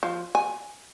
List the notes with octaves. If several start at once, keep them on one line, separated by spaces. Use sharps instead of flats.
F3
G#5